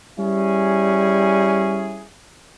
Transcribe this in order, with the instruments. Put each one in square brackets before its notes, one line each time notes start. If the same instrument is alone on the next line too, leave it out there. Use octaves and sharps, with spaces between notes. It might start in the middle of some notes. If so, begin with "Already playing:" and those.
[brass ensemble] G3 C#4 E4 G#4